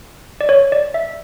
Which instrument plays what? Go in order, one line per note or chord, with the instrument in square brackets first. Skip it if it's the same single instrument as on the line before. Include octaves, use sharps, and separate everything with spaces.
[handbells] D5
C#5
D5
E5